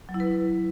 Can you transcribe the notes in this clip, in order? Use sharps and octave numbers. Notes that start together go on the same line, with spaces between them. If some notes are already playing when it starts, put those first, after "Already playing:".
F#3
E4
B4